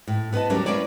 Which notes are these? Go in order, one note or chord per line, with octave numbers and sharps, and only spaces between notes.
A2
B3 B4 C5 D#5 A5
D2 F#3 G3 C#4 D4 A#4
A#3 C#4 E4 B4 C#5 D5